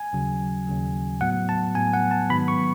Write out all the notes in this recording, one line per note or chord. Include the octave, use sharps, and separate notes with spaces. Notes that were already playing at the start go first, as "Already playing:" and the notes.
Already playing: G#5
D#2 C#3 F#3
D#2 C#3 F#3
A2 F#3 B3 F#5
A5
A2 F#3 B3 G#5
F#5
A5
G#2 D#3 F#3 B3 B5
C#6